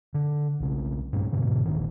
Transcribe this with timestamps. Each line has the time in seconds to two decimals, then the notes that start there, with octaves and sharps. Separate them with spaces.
0.14 D3
0.60 B1 C#3
1.13 G2 A#2 C#4
1.32 G#2 B2 D3
1.65 E1 A#1 D#3